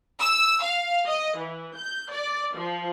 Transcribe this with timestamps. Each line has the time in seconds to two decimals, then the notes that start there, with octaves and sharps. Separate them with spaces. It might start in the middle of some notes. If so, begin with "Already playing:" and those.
0.21 E6
0.63 F5
1.06 D#5
1.38 E3
1.76 G6
2.11 D5
2.56 F3